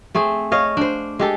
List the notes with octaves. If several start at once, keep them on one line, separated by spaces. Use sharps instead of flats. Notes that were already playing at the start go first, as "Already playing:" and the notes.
A3 C4 G#4
C#5 D#5 F5
D4 C5
G#3 G4 A4